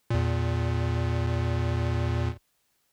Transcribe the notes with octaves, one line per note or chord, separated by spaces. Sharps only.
E2 A#2